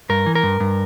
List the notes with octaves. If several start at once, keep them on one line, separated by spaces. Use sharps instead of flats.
G2 A#4
E3
A#4
G2
G2